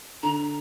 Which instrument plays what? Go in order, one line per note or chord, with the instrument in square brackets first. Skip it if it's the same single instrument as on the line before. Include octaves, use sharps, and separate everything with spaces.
[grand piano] D3 [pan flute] A#5